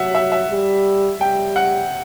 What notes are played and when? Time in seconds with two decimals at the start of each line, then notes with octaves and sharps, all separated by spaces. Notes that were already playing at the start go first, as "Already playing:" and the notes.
Already playing: F#3 E5 F#5
0.15 E5
0.32 E5
0.50 G3
1.20 G3 G5
1.56 F#5